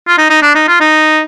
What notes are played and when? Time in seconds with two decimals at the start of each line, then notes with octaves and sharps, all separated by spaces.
0.08 F4
0.18 D#4
0.30 D#4
0.42 D4
0.55 D#4
0.68 F4
0.80 D#4